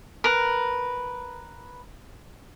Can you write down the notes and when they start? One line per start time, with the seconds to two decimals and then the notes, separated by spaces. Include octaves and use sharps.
0.24 A#4 B4